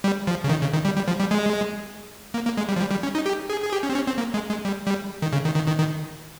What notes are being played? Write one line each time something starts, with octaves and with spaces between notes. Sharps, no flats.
G3
F3
C#3
D#3
C#3
D#3
G3
G3
F3
G3
G#3
A#3
A#3
G#3
G3
F3
G3
G3
C#4
D#4
G4
G#4
G#4
G4
C#4
C4
C#4
C4
A#3
G#3
G#3
G3
G3
D#3
C#3
D#3
D#3
D#3
D#3